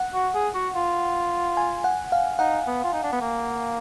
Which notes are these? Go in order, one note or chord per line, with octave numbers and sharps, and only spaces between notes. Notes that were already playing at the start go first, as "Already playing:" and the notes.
Already playing: F#5
F#4
G#4
F#4
F4
G#5
F#5
F5
D#4 F#5
B3
F4
D#4
D4
B3
A#3